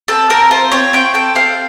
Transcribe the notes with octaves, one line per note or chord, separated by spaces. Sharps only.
C4 A4
A4 A#4
F4 C5
C4 C#5
C4 G5
A4 G5
C4 F5